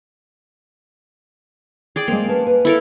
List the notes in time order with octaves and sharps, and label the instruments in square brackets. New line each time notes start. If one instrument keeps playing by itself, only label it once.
[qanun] G#4 D5 G5
[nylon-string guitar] G#3 C4 [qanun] A#3
[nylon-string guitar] C#4 B4 A5
B4
[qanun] E4 A4 A#4